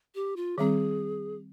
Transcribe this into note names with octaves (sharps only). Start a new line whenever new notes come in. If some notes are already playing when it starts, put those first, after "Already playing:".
G4
F4
D#3 G3 C4 G#4